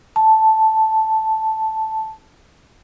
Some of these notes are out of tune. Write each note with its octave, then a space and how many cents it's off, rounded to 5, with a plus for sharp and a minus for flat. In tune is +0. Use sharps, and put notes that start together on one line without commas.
A5 +0